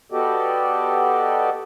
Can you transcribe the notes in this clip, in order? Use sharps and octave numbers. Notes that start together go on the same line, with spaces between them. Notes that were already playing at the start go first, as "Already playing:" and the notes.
B3 F#4 G4 A4 D5 D#5